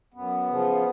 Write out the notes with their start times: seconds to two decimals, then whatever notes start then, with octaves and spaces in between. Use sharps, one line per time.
0.14 F#2 B3
0.49 C#3 F3